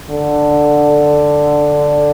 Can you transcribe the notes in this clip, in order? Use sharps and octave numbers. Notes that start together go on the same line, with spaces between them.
D3